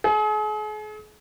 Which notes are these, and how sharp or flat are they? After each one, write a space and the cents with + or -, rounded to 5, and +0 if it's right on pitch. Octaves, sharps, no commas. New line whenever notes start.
G#4 +40